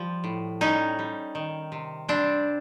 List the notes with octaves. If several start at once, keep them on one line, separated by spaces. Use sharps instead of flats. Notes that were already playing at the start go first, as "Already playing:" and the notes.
Already playing: F3 G3
A2
G3 C#4 D#4
G3
D#3
C3
G3 C4 D4